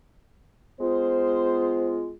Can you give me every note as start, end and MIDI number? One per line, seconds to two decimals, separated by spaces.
0.80 2.13 56
0.80 2.13 59
0.80 2.13 65
0.80 1.99 72